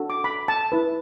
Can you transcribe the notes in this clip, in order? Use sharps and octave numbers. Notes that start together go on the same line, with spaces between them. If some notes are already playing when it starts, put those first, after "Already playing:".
Already playing: D4 F#4 A4
D6
B5
A5
E4 B4